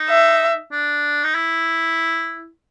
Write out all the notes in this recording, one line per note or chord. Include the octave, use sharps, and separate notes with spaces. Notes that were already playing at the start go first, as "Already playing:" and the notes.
Already playing: D#4
E5
D4
D#4
E4